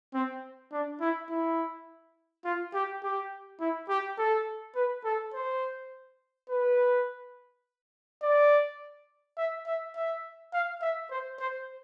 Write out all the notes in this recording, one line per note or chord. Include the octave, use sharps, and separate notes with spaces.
C4
D4
E4
E4
F4
G4
G4
E4
G4
A4
B4
A4
C5
B4
D5
E5
E5
E5
F5
E5
C5
C5